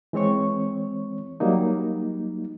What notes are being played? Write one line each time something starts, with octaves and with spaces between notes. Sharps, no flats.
E3 G#3 C4 C#5 C#6
F#3 G3 A#3 D#4